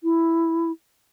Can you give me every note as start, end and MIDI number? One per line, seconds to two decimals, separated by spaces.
0.04 0.72 64